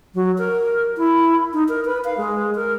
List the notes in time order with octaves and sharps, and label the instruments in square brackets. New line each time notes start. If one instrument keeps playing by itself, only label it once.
[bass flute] F#3
A#4
E4
D#4
A#4
B4
F5
G#3
A#4